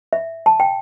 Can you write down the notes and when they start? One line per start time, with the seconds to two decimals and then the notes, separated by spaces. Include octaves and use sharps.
0.13 E5
0.46 A5
0.60 G5